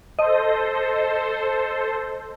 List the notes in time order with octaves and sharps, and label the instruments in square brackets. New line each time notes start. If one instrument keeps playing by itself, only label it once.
[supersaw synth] A4 C5 [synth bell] D#5